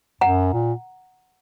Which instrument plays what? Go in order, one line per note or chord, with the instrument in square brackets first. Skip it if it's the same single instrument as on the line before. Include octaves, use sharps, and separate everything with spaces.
[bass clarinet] F#2 [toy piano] F#5 A#5
[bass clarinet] A#2